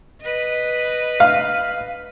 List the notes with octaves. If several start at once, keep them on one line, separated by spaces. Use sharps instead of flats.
B4 D#5
F5